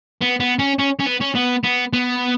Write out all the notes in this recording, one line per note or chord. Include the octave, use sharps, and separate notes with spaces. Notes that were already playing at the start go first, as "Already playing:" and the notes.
B3
B3
C#4
C#4
C#4
B3
C#4
B3
B3
B3